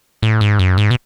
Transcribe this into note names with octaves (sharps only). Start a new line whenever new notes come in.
A2
G#2
F#2
G#2
B2